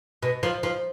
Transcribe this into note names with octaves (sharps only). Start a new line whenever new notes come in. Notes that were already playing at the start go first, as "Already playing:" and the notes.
B2
F3
F3